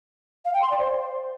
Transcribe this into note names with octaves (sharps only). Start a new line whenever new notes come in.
F5
G5
C6
D5
C5